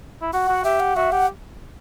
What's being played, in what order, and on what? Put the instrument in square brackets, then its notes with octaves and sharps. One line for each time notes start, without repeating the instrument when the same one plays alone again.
[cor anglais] E4
[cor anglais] F#4 [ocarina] F#5
[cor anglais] F#4
[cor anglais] G4 [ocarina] E5
[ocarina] F#5
[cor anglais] F#4 [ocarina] E5
[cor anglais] G4 [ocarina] F#5